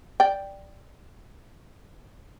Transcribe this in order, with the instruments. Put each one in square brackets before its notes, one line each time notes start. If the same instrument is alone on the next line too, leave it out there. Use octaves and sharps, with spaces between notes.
[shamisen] D5 G5